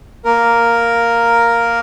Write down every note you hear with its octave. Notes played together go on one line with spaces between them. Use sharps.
A#3 A#4